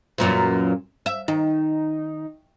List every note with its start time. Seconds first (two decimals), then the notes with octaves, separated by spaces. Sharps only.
0.18 F#2 A#2 E3
1.06 E5
1.28 D#3 D#4